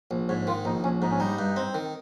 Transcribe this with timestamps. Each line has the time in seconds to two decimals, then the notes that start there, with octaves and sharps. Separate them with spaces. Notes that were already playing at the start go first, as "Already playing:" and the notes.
0.11 A#1
0.28 G#2 C#5
0.47 D#3 F4
0.65 A#1 D#4
0.84 A#1 C#4
1.02 G#2 D#4
1.11 C#4
1.20 G3 D#4
1.39 G2
1.56 C4
1.74 D#3